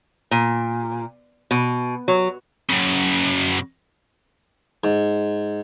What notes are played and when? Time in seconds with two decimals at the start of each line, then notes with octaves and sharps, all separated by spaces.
0.31 A#2
1.51 B2
2.08 F#3
2.69 F#2 C#3
4.84 G#2